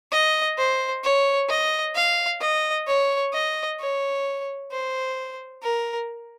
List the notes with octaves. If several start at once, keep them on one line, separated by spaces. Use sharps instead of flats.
D#5
C5
C#5
D#5
F5
D#5
C#5
D#5
C#5
C5
A#4